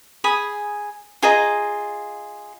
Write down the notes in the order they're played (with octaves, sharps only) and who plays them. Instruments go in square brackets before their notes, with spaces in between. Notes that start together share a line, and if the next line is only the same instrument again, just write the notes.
[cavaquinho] G#4 G#5 B5 D#6
F4 G#4 D#5 A#5